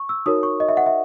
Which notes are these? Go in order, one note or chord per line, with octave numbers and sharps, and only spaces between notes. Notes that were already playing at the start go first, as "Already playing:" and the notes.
Already playing: C#6
E6
D#4 F#4 A#4 C#5 D#6
C#6
D#5
E5
F#5
E5